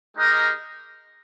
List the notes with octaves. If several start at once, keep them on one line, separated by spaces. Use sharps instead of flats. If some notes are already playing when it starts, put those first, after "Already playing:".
G#3 D#4 G4 A#4 D#5